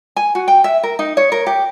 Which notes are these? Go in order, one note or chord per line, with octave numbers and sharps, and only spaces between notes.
G#5
F#4
G5
E5
A#4
D#4
C#5
A#4
G4